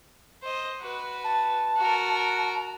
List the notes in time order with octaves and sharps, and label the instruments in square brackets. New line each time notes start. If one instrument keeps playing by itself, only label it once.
[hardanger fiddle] C5 D#5
F#4 B4
[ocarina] A5
[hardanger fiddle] F#4 A#4